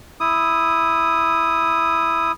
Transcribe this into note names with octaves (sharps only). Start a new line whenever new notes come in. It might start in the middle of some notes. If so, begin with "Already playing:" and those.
E4 D#6